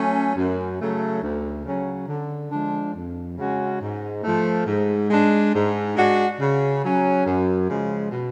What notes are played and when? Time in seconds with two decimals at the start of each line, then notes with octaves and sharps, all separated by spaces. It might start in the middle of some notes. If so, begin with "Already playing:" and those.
Already playing: F#3 A3 C#4
0.36 F#2
0.79 C#3 F#3 A3
1.22 D2
1.65 C#3 F#3 C#4
2.08 D3
2.51 F3 G#3 D4
2.95 F2
3.38 C#3 G#3 C#4 F#4
3.81 G#2
4.23 F3 A3
4.67 G#2
5.10 G#3 D4
5.53 G#2
5.96 G#3 D4 F#4
6.40 C#3
6.82 F#3 C#4
7.26 F#2
7.69 C#3 F3 G#3
8.11 B2